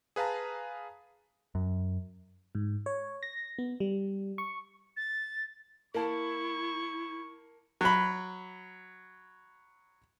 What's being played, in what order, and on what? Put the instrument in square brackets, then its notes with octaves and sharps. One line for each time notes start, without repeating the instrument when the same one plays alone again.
[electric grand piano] G#4 B4 F5 A5 A#5
[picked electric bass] F#2
[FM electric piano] G#2
C#5
A#6
B3
G3
C#6
[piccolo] A6
[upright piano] A#3 A5 [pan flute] E4 [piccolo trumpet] C#6
[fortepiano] F#3 B5